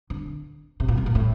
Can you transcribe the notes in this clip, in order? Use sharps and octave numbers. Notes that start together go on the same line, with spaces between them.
D3
C3
A#2
B2
A#2
A2